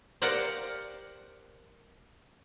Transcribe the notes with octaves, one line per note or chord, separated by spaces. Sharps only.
G4 A#4 C5 D5 F5 F#5